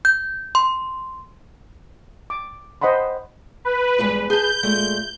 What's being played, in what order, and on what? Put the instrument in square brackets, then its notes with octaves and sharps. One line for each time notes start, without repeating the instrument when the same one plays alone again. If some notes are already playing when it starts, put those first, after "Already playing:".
[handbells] G6
C6
[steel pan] D6
C5 D#5 F#5 B5 C6
[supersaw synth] B4
[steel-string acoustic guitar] E2 G2 G#3
[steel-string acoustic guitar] G#4 A5 [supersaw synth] G6
[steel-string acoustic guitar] A#2 G#3 A3